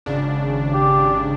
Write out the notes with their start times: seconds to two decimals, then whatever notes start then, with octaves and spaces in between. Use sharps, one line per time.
0.06 G#1 C#3 D4
0.74 G4